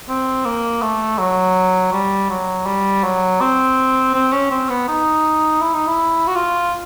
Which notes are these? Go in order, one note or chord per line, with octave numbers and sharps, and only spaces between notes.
C4
A#3
A3
F#3
G3
F#3
G3
F#3
C4
C4
C#4
C4
B3
D#4
E4
D#4
E4
F#4
F4